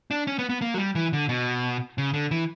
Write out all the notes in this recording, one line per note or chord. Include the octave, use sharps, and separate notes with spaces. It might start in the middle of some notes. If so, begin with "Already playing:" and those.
D4
C#4
B3
B3
A#3
F#3
G3
E3
D3
B2
C#3
D3
E3